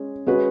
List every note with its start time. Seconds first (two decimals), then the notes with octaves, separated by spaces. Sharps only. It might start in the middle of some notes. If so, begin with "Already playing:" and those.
Already playing: G#3 C#4
0.26 G#3 C#4 F#4 B4